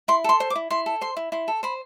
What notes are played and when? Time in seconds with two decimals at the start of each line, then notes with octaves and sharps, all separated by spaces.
0.08 E4 C6
0.24 A4 C6
0.40 C5
0.50 D6
0.55 E4
0.70 E4 C6
0.86 A4
1.01 C5 C6
1.17 E4
1.32 E4 C6
1.48 A4
1.63 C5 B5